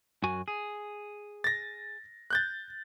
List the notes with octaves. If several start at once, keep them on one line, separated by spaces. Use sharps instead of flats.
F#2 F#4 G#5
G#4
A6 A#6
F#6 G6 A6